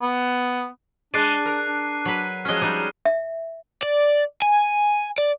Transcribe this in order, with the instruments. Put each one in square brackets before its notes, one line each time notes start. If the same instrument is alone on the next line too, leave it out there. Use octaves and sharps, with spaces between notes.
[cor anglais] B3
[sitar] G#3 [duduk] D4 [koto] D5 [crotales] F#6 C7 D#7
[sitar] A#4
[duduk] D4
[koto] F#3 B4
[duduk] F3 [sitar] F#3 G#3 [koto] C#4 D#5 [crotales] F6
[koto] G3 D#4
[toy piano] E5
[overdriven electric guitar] D5
G#5
D5